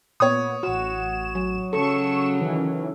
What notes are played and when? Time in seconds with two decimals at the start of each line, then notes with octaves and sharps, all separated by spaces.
0.20 A#2 B3 C#5 D#6
0.63 A1 F#4 E7
1.35 F#3
1.73 C#3 F#3 A4 C#6 C#7 E7
2.40 D#3 E3 C#4